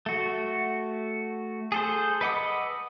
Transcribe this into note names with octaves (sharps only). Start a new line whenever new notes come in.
A3 F#4
G#4 A4 C5
B4 D#5 F#5 D6 E6